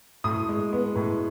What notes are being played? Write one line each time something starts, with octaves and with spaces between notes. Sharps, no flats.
A2 D#6
G#3
B3
A2